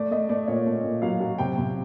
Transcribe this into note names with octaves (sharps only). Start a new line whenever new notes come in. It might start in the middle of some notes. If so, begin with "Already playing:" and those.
Already playing: A3 D5
A3 D#5
A3 D5
A#2 C#5
A3
A#2
F#3 F5
F#3
C3 G5
C3